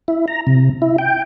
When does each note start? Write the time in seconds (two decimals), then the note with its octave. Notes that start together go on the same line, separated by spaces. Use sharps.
0.08 E4
0.28 A#5
0.47 C3
0.82 E4
0.99 G5